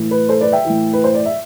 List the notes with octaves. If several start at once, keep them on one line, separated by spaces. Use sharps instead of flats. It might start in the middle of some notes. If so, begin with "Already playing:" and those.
Already playing: A2 E3
B4
A4 C5
B4 D5
E5 G5
A2 E3
B4
C5
D5
E5